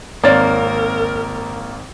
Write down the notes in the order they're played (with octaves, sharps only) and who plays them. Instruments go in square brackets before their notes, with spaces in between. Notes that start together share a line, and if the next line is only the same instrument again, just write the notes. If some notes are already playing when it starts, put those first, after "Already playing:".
[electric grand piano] G#1 A6 [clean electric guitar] A#3 [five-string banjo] C4 C#5 D5 [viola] A#4